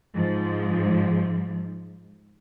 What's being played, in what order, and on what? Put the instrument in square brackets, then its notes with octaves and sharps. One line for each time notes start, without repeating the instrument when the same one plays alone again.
[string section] G#2 F3